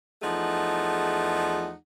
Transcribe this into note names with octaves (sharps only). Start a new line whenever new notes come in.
E2 F3 A3 D#4 G#4 F#5